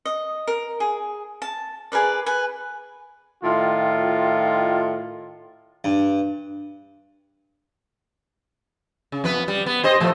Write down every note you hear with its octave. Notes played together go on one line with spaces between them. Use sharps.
D#5
A#4
G#4
A5
G#4 A#4 B4 D5
B4 G#5
A2 D#3 F4
G2
C#3
F2 B3 B4
G3
B3
G4 C5 D#5
A2 F3 A3